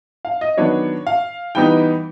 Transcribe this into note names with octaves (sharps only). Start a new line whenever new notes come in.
F5
D#5
D#3 F#3 B3 D4 C#5
F5
E3 G3 B3 D#4 G5